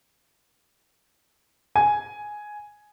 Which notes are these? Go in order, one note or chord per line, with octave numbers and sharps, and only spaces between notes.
G#5